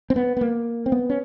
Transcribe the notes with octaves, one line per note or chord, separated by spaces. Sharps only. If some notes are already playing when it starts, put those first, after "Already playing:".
C4
B3
B3
A#3
C4
B3
C#4